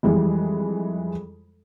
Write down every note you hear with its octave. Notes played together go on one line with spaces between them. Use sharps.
F2 E3 G3 G#3